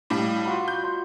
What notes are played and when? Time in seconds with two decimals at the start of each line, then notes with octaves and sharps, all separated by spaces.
0.10 A2 G3 D5 D#5 F5
0.46 F4 F#4 B5
0.68 G6
0.84 C6